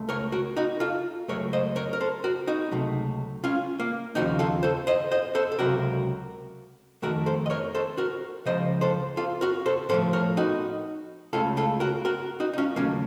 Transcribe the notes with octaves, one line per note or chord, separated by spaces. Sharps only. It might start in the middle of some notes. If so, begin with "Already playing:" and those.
Already playing: C#2 A3
A#4 C#5
F#4 A#4
D#4 F#4
F4 A4
C#2 C3 F#3 A3 A#4 C#5
C5 D#5
A#4 C#5
A#4
A4 C5
F#4 A#4
D#4 F#4
C#2 C3 F#3 A3
C#4 F4
A#3
D#2 C#3 F3 D#4 F#4
F4 A4
A4 C5
C5 D#5
C5 D#5
A4 C5
A4
C#2 C3 F#3 F#4 A#4
F2 D#3 A3 F#4 A#4
A4 C5
D#5
A#4 C#5
A4 C5
F#4 A#4
C#2 C#3 F3 C5 D#5
A4 C5
F4 A4
F#4 A#4
A4 C5
A2 F3 A3 A4 C5
A#4 C#5
D#4 F#4
C#2 C#3 A3 F4 A4
F4 A4
F#4 A#4
F#4 A#4
D#4 F#4
D#4
C#4 F4
D#2 C#3 F#3 A3 A#3 C#4